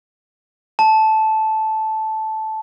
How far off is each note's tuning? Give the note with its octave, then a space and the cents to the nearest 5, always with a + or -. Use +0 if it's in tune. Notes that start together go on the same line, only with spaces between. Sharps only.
A5 -10